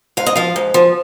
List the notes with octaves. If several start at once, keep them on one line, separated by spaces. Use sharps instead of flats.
G#2 F5
D#5
F3 F5
G#2
F3